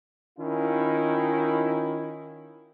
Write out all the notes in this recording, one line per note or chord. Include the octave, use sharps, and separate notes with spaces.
D#3 C#4 E4 F4